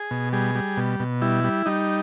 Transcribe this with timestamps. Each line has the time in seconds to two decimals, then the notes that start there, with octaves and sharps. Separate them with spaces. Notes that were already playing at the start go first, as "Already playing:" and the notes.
Already playing: G#4
0.11 B2
0.33 G3 G#4
0.55 G3
0.77 B2
1.00 B2
1.22 G3 E4
1.44 G3
1.66 G3 D#4